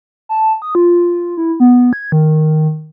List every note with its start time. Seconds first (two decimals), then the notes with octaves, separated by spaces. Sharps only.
0.29 A5
0.62 D#6
0.75 F4
1.37 E4
1.60 B3
1.93 G#6
2.12 D#3